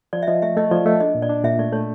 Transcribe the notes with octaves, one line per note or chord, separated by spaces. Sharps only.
F3 D5
E5
F3 D#5
A3 E5
A3 D#5
F3 D5
A3 D#5
D4 D#5
A#2
D5
D4
A#2 E5
A3 D5
A3 C#5